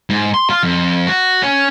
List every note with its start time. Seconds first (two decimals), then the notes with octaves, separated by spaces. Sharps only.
0.10 G#2
0.34 C6
0.50 F4
0.63 F2
1.07 F#4
1.42 C#4